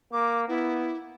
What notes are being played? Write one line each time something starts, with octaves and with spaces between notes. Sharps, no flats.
A#3 D6
B3 E4